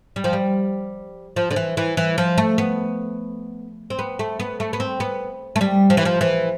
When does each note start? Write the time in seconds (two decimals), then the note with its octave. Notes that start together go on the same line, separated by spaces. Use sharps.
0.16 G3
0.24 F3
0.33 G3
1.36 F3
1.50 D3
1.56 E3
1.77 E3
1.97 E3
2.18 F3
2.38 A3
2.58 B3
3.90 C4
3.99 B3
4.19 A3
4.40 B3
4.60 A3
4.73 B3
4.80 C4
5.00 B3
5.56 A3
5.61 G3
5.90 F3
5.97 E3
6.05 F3
6.21 E3